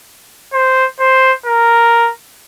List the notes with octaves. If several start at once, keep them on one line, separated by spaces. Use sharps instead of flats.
C5
C5
A#4